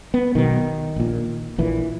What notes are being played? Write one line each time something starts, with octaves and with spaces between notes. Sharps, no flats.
B3
B1 B2 D#3
A#1 A#2
A#1 A#2 E3